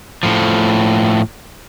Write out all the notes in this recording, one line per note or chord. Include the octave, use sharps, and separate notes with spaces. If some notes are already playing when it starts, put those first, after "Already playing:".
A2 F3